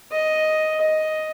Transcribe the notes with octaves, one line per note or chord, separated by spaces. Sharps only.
D#5
D#5